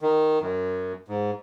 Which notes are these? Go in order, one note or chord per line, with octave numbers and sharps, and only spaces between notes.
D#3
F#2
G#2